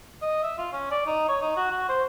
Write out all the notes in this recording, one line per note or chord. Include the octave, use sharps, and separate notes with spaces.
D#5
E5
F4
C#4
D5
D#4
C#5
D#4
F#4
F#4
C5